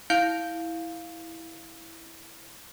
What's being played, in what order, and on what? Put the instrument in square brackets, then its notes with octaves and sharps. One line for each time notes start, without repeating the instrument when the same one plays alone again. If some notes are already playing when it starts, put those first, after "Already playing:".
[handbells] E4 F5 G6 D7